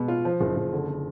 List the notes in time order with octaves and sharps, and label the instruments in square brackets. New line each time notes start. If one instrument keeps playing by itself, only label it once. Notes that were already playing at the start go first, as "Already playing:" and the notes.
Already playing: [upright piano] B2 G#3 B3
F4
F3
F#1
F#1
D3
D3